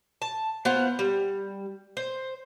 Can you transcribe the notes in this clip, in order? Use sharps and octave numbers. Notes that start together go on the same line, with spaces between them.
A5
B3 F4 C5 F#5
G3
C5